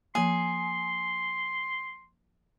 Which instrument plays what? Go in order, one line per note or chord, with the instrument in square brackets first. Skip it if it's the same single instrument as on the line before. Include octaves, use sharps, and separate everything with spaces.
[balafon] F3 A#3 [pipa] G#4 [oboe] C6